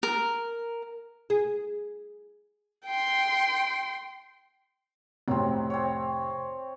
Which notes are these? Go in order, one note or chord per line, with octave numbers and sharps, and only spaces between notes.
A#4
G#4
G5 C6
F1 A2 F#3 C4
C4 C#5